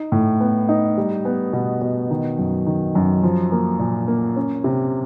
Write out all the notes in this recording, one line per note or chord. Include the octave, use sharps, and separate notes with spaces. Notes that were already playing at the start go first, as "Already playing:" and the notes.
Already playing: D#4
A2
B3
D#4
G3
B3
B2
B2
D#3
F#2
D#3
F#2
F3
A#3
A#2
A#3
C#4
C3